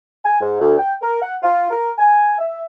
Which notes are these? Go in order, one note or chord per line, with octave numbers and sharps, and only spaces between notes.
G#5
G#2
D2
G5
A#4
F#5
F4
A#4
G#5
E5